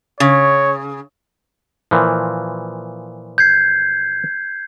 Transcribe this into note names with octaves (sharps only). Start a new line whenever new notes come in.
C#3 C#5
A#2 E3 F3
G6 G#6 C7